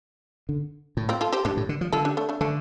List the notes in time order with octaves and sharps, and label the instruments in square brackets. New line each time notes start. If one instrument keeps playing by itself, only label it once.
[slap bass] D3
A2
[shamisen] C4 F4
F4 A4
G4 C5
[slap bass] G2 [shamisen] D4 G4
[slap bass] A2
D3
F3
[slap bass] D3 [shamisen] F4 A4
[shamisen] D4 G4
A3 D4
A3 D4
[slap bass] D3 [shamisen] A3 D4